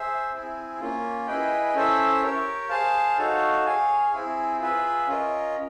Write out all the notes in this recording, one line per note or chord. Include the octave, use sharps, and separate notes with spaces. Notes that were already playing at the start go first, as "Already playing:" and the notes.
Already playing: G#4 C5 E5
C4 E4 G#4
A#3 C#4 F4
E4 G#4 B4 D#5 G5
C#4 E4 A4 C5 E5
G4 A#4 C#5
G#4 C5 F5 A5
D#4 F#4 A4 C#5 F5
G#4 C#5 F5 G#5
C4 E4 G#4
F4 G#4 B4 E5
C#4 F4 A#4 D#5